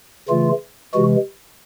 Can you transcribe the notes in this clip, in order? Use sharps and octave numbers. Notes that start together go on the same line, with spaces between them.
C#3 E3 A3 F4
C3 E3 G#3 F#4